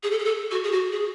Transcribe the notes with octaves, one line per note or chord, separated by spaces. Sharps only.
G#4
A4
G#4
A4
F#4
G#4
F#4
G#4